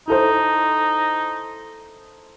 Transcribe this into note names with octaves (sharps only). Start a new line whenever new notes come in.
D#4 E4 A4 C5